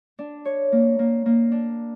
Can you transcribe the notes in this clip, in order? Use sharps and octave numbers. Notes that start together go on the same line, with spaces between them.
D4
C#5
A#3
A#3
A#3
D4